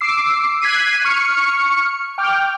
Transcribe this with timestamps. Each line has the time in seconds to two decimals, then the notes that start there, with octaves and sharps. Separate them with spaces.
0.01 D6 E6 C7
0.62 F#6 G#6 B6 C7 D#7
1.05 C#6 F6 C#7
2.18 G5 D6 F6